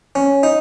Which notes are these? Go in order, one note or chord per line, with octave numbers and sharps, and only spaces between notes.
C#4
D#4